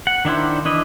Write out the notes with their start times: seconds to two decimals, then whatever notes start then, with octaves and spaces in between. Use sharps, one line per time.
0.07 F#5
0.25 D#3 D4 E4 C5
0.65 E3 D4 E4 D#5